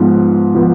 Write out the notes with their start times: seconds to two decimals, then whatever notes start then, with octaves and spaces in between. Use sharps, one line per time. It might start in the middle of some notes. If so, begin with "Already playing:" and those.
Already playing: G#2 F3 B3
0.55 F3 B3